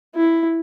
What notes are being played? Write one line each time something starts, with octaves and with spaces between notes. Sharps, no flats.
E4